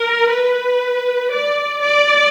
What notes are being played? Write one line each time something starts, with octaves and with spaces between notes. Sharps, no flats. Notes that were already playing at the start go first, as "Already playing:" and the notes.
Already playing: A#4
B4
D5
D5